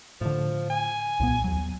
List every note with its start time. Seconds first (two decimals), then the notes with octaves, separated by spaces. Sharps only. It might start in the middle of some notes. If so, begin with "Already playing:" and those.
0.21 A2 D3 F3
0.70 G#5
1.20 C2 A#2 B3
1.44 D#2 F#3